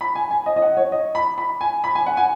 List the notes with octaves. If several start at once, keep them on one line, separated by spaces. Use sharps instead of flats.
B5
G#5
G#5
D#5
D#5
F#5
C#5
D#5
B5
B5
G#5
B5
G#5
F#5
G#5